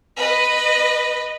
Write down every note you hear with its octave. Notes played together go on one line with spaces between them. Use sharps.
B4 D#5